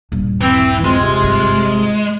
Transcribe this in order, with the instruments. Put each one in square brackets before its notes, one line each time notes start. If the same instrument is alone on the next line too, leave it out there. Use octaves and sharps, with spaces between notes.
[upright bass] D#1 G2
[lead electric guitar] E3 [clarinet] C4
[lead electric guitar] G#3 [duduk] C4 [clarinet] F4
[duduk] C3
[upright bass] G#1 G2